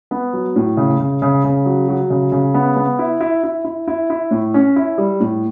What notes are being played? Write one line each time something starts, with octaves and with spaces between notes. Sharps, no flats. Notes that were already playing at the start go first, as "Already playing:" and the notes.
B3
F#3
A2
C#3
C#3
C#3
C#3
F#3
F#3
C#3
C#3
B3
B3
E4
E4
E4
E4
E4
E4
A2
C#4
E4
G3
A2